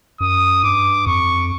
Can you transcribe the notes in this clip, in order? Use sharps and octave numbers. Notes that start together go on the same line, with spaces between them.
F#2 D#6
G2 D6
F2 C#6